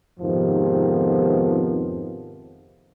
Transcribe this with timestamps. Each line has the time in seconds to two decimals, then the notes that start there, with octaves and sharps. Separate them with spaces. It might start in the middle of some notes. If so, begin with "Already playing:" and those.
0.20 F2 G#2 C3 D#3 F3 B3